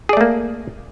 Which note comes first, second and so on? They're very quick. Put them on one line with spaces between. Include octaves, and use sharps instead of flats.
G#4 D5 A3 A#3